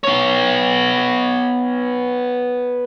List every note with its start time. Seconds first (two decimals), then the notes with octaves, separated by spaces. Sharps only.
0.04 B3 C#5